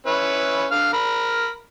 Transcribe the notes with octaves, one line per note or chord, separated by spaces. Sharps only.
C#4 E4 B4
D3 F5 F6
A#4 B5